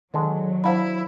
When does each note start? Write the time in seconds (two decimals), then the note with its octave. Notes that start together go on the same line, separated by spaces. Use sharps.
0.14 D3 D#3 F#3 G#3
0.64 D4 E4 C5 F5 F#5 A#5 B5